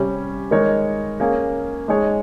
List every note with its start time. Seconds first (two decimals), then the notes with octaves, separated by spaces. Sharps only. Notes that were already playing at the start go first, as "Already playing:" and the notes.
Already playing: C3 G3 C#4
0.51 D#3 G#3 D#4 A#4 C#5
1.20 A#3 C#4 G#4
1.88 G#3 D#4 G#4 C#5